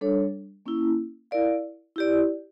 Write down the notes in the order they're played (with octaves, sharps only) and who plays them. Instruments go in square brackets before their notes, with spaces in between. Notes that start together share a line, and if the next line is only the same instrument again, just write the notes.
[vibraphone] G3 D4 A4 C#5
A#3 C#4 E4
E4 A#4 D5 F5
E4 G4 D5